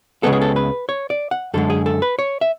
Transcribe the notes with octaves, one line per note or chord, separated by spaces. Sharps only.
C#2 C#3 G#3 B3 A4
G#4
A4
B4
C#5
D5
F#5
F#2 D3 G#3 A4
G#4
A4
B4
C#5
E5